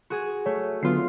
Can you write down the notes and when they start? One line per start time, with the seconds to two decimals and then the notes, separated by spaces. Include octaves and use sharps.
0.10 F#4 G#4
0.46 A3 C#5
0.83 D3 F#3 B3 F4 C7